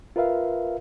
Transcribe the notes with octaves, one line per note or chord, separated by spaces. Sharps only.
F4 A#4 B4 E5 F5